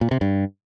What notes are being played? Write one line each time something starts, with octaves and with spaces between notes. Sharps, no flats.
A#2
C3
G2